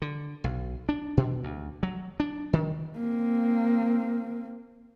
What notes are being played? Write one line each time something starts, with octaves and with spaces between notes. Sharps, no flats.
D3
B1
D4
B2
D2
F#3
D4
D#3
A#3 C4